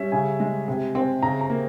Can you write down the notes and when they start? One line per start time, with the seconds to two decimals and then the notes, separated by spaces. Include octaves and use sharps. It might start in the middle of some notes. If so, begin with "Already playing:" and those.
Already playing: G3 C#4 E5
0.12 C#3 G#5
0.40 G#3
0.68 C3
0.95 C4
1.23 C#3 A#5
1.41 A#5
1.50 A#3